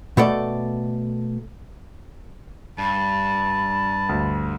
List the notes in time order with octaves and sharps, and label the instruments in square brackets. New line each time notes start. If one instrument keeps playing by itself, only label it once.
[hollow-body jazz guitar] B2 A3 A4 D5
[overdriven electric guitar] G2 [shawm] A5 [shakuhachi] B5
[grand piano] D2